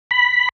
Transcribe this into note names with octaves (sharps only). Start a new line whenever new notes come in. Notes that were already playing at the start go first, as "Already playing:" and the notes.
B5